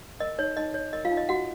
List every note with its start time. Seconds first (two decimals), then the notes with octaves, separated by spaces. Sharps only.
0.20 A#4 D#5
0.38 D#4 C#5
0.57 D#4 D#5
0.74 C#5
0.93 A#4 D#5
1.05 F4 F5
1.11 D#4
1.17 D#5
1.29 D#4 F#4 F#5